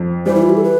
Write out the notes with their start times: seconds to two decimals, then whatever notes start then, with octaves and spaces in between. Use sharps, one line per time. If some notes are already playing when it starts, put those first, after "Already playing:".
Already playing: F2
0.26 E3 G3 C5
0.35 E4
0.42 F4
0.49 G4
0.57 A4
0.64 B4